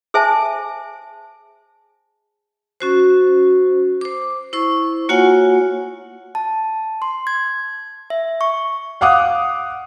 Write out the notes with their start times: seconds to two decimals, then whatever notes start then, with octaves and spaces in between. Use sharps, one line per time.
0.14 G#4 C5 E5 G#5 A5
2.80 C#4 F#4 C5
4.01 C5 D6
4.53 E4 C5 C#6
5.09 A#3 F4 F#4 C#5 F#5 G#5
6.35 A5
7.02 C6
7.27 G#6
8.10 E5
8.41 C#6
9.01 F5 F#5 D6 D#6 F#6